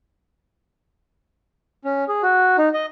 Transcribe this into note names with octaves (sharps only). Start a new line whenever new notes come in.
C#4
G#4
F#4
D#4
D#5